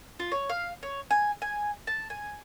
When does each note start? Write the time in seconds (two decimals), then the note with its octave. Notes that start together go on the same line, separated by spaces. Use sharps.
0.20 F4
0.32 C#5
0.50 F5
0.83 C#5
1.11 G#5
1.42 G#5
1.87 A5
2.10 G#5